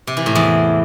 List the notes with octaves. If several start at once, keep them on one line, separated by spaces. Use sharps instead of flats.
C3
E3
A2
E2